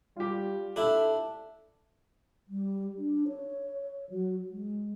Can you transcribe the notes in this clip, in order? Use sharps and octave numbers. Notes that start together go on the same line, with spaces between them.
G3 F4 G4
D4 E4 A4
G3
D4
C#5
F#3
G#3